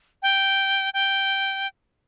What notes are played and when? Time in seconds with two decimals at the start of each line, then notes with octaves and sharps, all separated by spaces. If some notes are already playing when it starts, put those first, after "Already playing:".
0.23 G5
0.94 G5